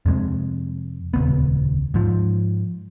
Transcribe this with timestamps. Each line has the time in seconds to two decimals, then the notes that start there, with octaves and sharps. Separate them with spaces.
0.06 F2 C3 G#3
1.14 D#1 C#2 B3
1.94 G#2 F3